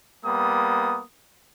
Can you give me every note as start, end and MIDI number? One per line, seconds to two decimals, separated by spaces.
0.23 1.01 55
0.23 1.01 58
0.23 1.01 59
0.23 1.01 87